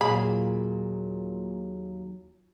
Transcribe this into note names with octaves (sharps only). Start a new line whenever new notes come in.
D#2 A#2 F#3 G#4 F5 B5